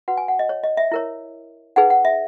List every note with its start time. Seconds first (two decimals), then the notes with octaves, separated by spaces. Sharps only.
0.08 F#4 B4 F#5
0.17 G#5
0.28 F#5
0.39 D#5
0.49 C#5
0.64 D#5
0.77 E5
0.92 E4 A#4 C#5
1.76 D#4 G#4 B4 F#5
1.90 F#5
2.05 E5